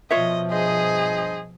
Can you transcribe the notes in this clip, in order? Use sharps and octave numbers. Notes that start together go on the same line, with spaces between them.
B2 F3 F4 C#5 D#5 E5
G2 G#4 C5 D#5